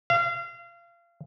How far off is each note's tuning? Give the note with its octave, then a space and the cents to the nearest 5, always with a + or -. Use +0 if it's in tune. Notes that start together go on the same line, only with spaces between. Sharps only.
F5 -30